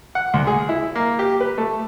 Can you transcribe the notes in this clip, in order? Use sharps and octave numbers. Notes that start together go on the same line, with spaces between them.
F#5
D2
G#4
E4
A#3
G4
B4
A3